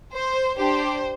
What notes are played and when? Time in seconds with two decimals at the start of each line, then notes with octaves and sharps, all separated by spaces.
0.14 C5
0.58 D4 G4 C5